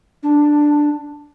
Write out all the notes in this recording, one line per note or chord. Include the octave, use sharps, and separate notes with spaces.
D4